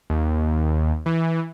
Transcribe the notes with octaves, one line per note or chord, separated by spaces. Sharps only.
D#2
E3